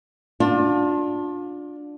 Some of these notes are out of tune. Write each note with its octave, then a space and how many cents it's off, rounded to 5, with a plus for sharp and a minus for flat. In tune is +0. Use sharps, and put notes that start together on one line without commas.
D4 +0 F4 +35